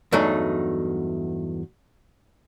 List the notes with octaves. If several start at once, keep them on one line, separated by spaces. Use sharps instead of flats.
E2 G2 F#3 A3 D#4